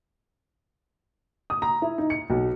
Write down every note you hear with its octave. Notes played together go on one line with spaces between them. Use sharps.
D#6
A#5
E4
D#4
C#7
B1